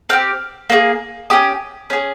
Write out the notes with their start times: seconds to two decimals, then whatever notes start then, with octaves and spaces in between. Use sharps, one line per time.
0.09 C4 G4 F6
0.70 A#3 F4 G#4
1.30 C#4 G4 D#6
1.90 C#4 G#4